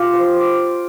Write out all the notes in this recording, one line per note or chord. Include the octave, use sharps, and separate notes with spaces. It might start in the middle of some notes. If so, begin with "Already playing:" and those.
Already playing: F4 G4
C5
D5